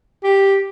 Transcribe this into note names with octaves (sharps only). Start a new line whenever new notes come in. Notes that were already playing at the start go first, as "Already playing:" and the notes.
G4